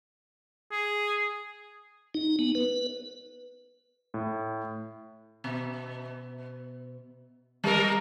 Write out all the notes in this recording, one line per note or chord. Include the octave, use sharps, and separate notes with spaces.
G#4
D#4
B3
B4
A2
B2
G3 A#4